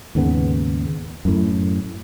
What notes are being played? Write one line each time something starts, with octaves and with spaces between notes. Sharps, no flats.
D#2 G#2 C#3 B3
F#2 A2